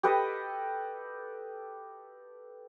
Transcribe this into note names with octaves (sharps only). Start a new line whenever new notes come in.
G4 A4 B4 D#5